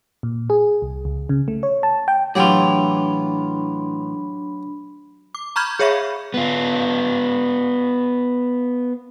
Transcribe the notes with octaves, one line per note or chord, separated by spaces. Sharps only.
A#2
G#4
C2
C#2
C#3
A3
C#5
A5
G5
A2 E3 F#3 D4 F4 G4 B5
D6
A#5 B5 C#6 F6 G6 G#6
G#4 C#5 E5 F5 B5 C#6
B3 F4